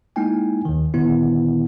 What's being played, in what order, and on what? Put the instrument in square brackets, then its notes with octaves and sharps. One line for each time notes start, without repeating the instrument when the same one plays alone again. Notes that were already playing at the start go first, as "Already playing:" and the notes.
[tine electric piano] G#3 A#3 D#4 E4 G5 G#5
D#2 D#3
A#2 D3 D#3 B3 E4